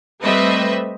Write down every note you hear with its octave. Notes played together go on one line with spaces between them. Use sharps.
G3 A3 C4 B4 D#5 E5